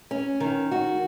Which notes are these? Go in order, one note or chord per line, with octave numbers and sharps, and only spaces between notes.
C#4
D#3
F#4